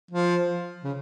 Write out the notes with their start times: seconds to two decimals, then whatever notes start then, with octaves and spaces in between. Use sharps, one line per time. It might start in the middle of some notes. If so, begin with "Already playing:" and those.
0.11 F3
0.84 C#3